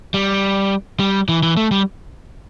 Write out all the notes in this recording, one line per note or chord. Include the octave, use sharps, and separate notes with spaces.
G3
G3
E3
E3
A3
G3